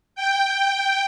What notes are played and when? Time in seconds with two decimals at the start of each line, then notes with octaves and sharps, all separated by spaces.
0.15 G5